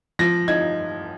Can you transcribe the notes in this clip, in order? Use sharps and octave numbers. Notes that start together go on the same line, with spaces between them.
F3 A#6
D#4 G#6